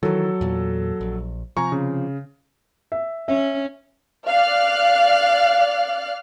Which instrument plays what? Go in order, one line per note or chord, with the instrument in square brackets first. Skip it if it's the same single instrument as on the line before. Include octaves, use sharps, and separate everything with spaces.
[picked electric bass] D#3 E3 [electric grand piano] F#3 A4
[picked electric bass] E2 A#2
A#1
[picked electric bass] C3 F3 [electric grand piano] G#5 A#5 C#6
[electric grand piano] C#3
[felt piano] E5
[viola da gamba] C#4 [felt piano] E5
[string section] D5 F5 F6 F#6